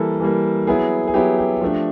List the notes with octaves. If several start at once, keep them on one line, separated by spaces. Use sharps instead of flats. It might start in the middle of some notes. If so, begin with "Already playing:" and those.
Already playing: E3 G3 A#3 A4
E3 G3 A#3
F#3 B3 E4 G#4
G#4
F#3 B3 E4 G4
G4
F3 A3 D4